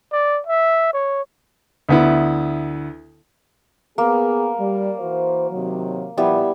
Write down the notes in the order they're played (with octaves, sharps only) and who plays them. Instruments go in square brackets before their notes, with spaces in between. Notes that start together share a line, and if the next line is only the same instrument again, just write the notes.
[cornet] D5
E5
C#5
[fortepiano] D2 B3 E4
[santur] A#3 [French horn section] B3 G#4
[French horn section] G3
E3 F#4 C5
C3 D#3 F#3
[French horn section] A#2 F3 [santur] G3 B3 E4